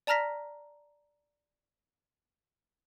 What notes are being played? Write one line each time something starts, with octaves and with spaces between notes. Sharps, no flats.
D5 A5 A#5 F6 A#6 B6